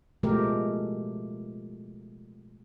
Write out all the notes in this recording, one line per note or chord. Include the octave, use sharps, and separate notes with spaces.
B2 F3 G#3 A3 G4 A#4